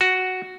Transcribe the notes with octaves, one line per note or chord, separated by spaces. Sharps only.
F#4